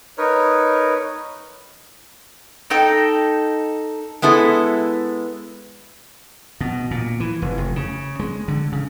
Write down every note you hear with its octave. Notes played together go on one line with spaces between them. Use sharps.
D#4 A#4 B4 C#5
D#4 A4 G5
G#3 B3 E4 A4
B2
A#2
E3
F1
F1
C#3
G#3
D3
C#3